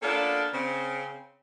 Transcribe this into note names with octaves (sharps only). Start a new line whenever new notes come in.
A#3 B3 C#4 D4 F4 A4
C#3 C4